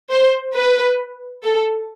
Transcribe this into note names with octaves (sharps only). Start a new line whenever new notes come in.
C5
B4
A4